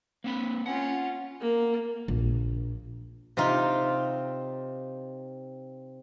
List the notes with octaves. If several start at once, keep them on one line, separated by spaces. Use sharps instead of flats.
A#3 C4 B5
C#4 F4 F#5
A#3
A#1
C3 C4 D#4 F4